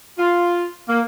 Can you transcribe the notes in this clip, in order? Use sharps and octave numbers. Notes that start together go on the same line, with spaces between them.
F4
A#3